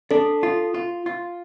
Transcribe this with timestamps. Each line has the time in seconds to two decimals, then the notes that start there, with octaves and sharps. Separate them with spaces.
0.11 D4 A4
0.43 F4
0.74 F4
1.06 F4